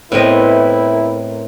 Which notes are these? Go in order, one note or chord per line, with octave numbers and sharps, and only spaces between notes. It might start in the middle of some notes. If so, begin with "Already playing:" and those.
A2 B3 C4 E4 A#4 D#5